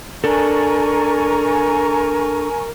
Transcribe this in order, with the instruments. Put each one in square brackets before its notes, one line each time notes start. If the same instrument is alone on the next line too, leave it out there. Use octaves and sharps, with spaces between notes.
[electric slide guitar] D4 A4 [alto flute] A#4 [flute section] G#5 A#5 C#6